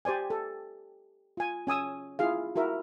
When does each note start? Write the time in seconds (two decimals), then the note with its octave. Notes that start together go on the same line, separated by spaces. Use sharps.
0.05 G4 C5 D5 G#5
0.30 A4
1.37 F4 G#5
1.67 C#4 G#5 D#6 E6
2.19 E4 F4 G#4 F5
2.56 E4 F#4 A#4 E5